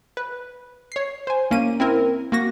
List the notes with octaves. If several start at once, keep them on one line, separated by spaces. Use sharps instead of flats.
B4
C#5 C7
C5 G#5
C2 A#3 C#4 D#7
C4 E4 A#4
A#3 F#4 A#6